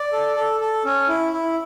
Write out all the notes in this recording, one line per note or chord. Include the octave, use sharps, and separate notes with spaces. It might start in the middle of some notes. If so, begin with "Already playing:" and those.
Already playing: D5
A4
A4
A4
C#4
E4
E4